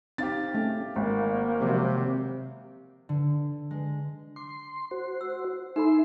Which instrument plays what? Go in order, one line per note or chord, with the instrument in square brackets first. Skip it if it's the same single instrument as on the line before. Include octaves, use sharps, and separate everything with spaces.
[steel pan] C4 D#4 [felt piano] G4 F5 A6
[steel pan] A3 C#4
[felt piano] G#1 [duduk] A#3
[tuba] C3 [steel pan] D#3 F3 F#3
[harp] D3
G#3
[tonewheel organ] C6 [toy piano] D6
[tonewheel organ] F#4 C5
[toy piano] E6
[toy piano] D#4 A4 B5 [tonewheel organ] E5 C6